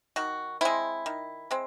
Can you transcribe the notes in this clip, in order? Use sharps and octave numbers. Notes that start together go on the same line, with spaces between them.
D#3 F#4
G#3 C4 E4
D#3
G#3 C4